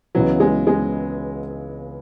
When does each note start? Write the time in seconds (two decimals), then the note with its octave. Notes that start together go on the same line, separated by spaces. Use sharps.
0.15 C#2 C#3 E3 F#3 B3
0.40 G#3
0.67 G#3